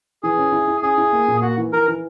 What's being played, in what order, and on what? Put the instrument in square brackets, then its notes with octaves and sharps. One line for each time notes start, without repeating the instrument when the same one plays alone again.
[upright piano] E3 [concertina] G#4
[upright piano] C#4
E4
E4
[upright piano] C#4 [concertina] G#4
[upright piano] E4
A#3
A#2
[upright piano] A#3 [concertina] F#4
[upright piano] E3
[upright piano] E3 [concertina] A#4
[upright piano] E3